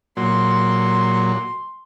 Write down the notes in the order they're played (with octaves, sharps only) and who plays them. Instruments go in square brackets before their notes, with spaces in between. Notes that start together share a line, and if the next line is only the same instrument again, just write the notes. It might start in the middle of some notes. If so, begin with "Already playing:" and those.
[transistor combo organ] A#2 F#3 [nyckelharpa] C6